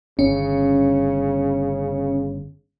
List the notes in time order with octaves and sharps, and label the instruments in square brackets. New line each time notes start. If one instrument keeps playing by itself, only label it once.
[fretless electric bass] G1 [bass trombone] C#3 [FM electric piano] C#4